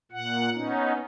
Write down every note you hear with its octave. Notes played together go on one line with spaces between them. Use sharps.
A#2 F#5
B3 C#4 D#4